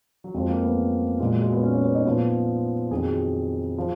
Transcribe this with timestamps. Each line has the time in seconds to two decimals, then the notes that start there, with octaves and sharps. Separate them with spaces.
0.24 F#3
0.34 F2 F3 G#3
0.49 A#3
0.63 B3
1.20 A#2 F#3 G#3
1.31 F#3
1.42 G#3
1.52 B3
1.63 C#4
1.73 C#4
1.84 B3
1.95 D#4
2.05 A#2 F3 B3
2.91 F2 D#3 F#3 G#4
3.78 F3